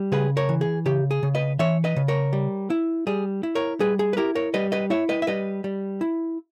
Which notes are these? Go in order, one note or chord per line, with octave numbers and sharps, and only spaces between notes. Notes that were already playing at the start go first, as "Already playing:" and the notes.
Already playing: G3
C#3 G#4 B4
A#4 C#5
E3
G#4
C#3 G4
G#4
C#3
B4 D#5
E3 C#5 E5
B4 D#5
C#3
A#4 C#5
G3
E4
G3 G#4
E4
A#4 C#5
G3 G#4 B4
G#4
B4
E4 G4 A#4
A#4 C#5
G3 B4 D#5
B4 D#5
E4 C#5 E5
B4 D#5
E5
G3 B4 D#5
G3
E4